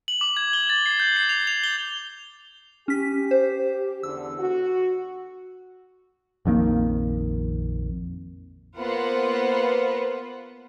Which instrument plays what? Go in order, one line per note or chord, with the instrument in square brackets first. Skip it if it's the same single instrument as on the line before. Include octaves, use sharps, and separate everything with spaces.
[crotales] F#7
D6
G#6
G7
A6
C7
G6
C7
F7
F7
G7
[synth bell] C#4 B6 [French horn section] G4
[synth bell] C5
[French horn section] E2 D3 [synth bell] E6
[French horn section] F#4
[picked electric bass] A#1 F2 D#3 A#3
[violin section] A#3 B3 F4 B4 C5 F#5